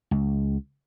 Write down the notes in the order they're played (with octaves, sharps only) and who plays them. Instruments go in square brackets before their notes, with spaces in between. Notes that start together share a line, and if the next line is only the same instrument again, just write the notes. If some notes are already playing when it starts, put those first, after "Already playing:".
[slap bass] C#2